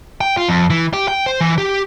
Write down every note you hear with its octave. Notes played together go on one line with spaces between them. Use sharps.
G5
F4
F2
E3
G4
G5
C5
E3
G4